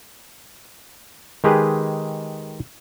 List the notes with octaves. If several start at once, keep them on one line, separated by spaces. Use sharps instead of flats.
D#3 G#3 G4 G#4 B4